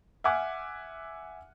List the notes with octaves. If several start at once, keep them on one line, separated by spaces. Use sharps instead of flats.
E5 F#5 G#5 D6 F6 F#6